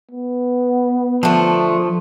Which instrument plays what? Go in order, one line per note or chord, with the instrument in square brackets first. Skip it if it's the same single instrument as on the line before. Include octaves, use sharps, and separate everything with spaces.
[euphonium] B3
[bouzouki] D3 A3 [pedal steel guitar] F3